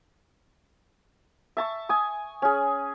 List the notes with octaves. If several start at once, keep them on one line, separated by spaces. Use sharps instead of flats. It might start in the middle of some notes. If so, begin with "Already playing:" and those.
E5 A5 C#6
G#5 D#6
C#4 G#4